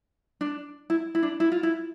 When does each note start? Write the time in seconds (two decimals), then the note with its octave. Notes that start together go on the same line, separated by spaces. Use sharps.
0.41 D4
0.90 E4
1.15 E4
1.23 D4
1.40 E4
1.52 F4
1.63 E4